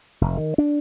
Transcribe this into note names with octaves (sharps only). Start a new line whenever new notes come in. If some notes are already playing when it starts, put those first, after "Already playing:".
F1
D#3
D4